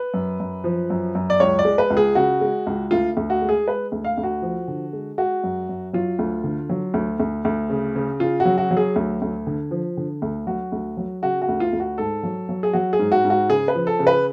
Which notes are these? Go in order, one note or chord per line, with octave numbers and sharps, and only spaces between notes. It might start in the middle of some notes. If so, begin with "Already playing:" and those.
Already playing: B4
F#2
F#2
F3
F#2
F#2
D5
C#2 C#5
D5
G#3
B4
C#2
G#4
C#3 F#4
G#3
C#2
D2 F4
D2
F#4
G#3
G#4
G#3 B4
D2
F5
D2
F#4
F3
D3
G#3
G#3 F#4
F#2
F#2
F#3 F4
D2
D3
F#3
D2
D2
D2
C#3
C#3
C#3 F4
F#4
F#3
F#4
F#3
G#4
D2
D2
D3
F3
D3
D2
F#3 F#4
D2
F#3
C#3 F#4
F#4
D2
F4
D2
F#4
G#2 A4
F#3
F#3
G#4
F#3 F#4
G#4
G#2
F#4
G#2
F#4
C#3 G#4
B4
F3
A4
C#3
B4